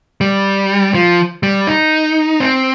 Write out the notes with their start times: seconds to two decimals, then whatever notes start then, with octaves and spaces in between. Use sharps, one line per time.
0.21 G3
0.94 F3
1.43 G3
1.67 D#4
2.40 C4